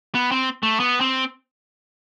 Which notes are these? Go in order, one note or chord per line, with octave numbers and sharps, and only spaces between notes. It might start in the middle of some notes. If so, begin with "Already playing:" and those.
B3
C4
A3
B3
C4